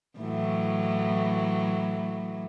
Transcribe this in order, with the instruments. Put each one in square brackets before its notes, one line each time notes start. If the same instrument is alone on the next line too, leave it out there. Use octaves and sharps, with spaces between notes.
[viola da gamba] A2 E3 F#3